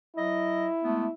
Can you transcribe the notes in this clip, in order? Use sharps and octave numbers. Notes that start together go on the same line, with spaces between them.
F#3 E4 D#5
G#3 A3 B3